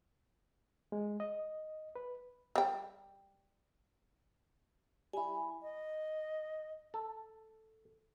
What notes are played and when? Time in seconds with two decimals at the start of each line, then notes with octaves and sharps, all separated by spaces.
0.92 G#3
1.20 D#5
1.96 B4
2.56 G3 G5
5.13 G3 E4 G#5 B5
5.62 D#5
6.94 A4